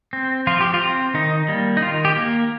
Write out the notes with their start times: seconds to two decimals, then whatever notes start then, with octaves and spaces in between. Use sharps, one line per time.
0.13 C4
0.47 F3 F4
0.60 G4
0.74 F4
0.81 C4
1.14 D#3 D#4
1.48 G3 A#3
1.77 D#4
1.82 D#3 F4
2.05 G4
2.16 A#3